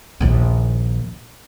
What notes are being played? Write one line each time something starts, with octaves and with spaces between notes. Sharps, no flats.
A#1 D#2